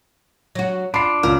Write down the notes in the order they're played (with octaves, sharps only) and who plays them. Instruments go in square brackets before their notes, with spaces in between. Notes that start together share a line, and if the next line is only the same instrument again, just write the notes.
[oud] F#3 F#4
[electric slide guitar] D4 [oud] F4 [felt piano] B5 C7
[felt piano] C#2 [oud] A#4